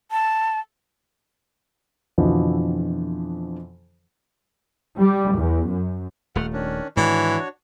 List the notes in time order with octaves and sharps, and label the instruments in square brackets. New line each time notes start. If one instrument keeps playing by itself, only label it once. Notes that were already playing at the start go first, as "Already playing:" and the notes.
[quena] A5
[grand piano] F2 B2 D3 E3 F3 E4
[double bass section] G3
E2
F#2
[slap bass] D#1 A3 [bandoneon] F#5 F6
[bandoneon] D#3 C#4 D4
[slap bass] G#2 D#3 [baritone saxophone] E3 [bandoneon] D4 F#4 C#5